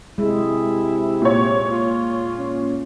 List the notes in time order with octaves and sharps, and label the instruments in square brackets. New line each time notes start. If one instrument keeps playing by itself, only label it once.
[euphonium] C3 [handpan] G#3 [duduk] E4
[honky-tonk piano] A#2 C#5
[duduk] F4
[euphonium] C#4